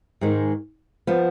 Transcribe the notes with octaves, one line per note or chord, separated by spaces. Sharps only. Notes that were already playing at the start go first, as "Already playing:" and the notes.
G#2 D#3 G#3
F3 B3